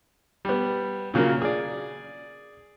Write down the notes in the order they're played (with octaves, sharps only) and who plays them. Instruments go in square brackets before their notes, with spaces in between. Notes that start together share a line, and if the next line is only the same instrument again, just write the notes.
[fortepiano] G3 B3
A#2 C#3 F#3 A#3
G#4 D5